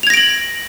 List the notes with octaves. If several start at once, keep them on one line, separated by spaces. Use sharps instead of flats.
G#6 A#6 D7 F7 F#7